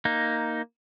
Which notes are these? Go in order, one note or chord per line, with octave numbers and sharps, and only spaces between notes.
A#3 D#4